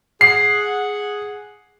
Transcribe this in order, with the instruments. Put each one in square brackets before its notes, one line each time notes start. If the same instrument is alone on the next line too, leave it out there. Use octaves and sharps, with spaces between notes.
[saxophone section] G#4 F#5 [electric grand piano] C7